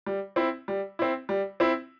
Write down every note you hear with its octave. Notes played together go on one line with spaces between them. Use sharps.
G3
C4 E4
G3
C4 E4
G3
C4 E4